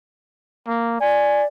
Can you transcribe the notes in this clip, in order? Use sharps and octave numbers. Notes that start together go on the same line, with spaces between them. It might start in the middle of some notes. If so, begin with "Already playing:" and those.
A#3
D5 G#5